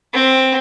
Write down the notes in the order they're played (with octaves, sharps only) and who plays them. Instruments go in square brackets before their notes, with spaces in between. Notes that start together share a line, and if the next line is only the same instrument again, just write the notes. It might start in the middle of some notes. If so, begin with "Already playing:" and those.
[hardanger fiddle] C4